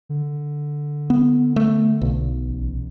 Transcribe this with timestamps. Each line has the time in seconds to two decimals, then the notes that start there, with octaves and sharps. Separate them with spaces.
0.09 D3
1.10 B3
1.56 A3
2.01 B1
2.48 A1